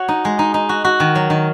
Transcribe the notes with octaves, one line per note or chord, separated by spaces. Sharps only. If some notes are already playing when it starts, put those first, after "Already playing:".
Already playing: F#4 C#5
D#4
G#3
D#4
D#4
F#4
F#4
D#3
F#3
D#3